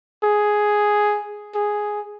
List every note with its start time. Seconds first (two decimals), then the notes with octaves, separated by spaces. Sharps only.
0.24 G#4
1.55 G#4